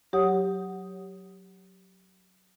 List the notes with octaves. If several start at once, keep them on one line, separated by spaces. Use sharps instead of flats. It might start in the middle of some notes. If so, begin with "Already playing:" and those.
F#3 G4 C#5 F#5 D#6